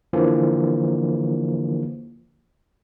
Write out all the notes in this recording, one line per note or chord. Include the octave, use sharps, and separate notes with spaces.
D3 E3 F3 A#3